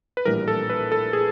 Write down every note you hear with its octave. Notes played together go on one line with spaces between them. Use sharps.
B4
A#1 A2 E3 G3 A#4
A4
B4
A4
G#4